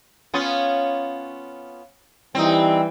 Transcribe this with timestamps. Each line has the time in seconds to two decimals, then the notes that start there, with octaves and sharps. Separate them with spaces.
0.34 B3 C#4 F4
2.35 E3 G3 C4 D#4